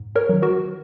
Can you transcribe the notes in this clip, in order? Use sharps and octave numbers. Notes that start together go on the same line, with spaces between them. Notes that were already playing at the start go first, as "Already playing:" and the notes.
Already playing: G#2
A#4 C#5
D#3 F#3
F#4 A#4